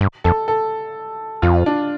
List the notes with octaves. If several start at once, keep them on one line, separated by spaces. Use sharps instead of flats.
G2
F2 A4
A4
F2 F4
D4